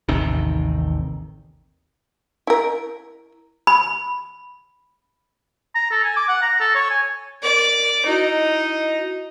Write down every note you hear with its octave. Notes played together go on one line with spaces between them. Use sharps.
A1 D#2 C3 D#3
E4 A#4
B5
A#5
A4
G#5
D6
F#5
A#5
A4
C#5
G#5
A#4 D5
D#4 E4 F#4 D#5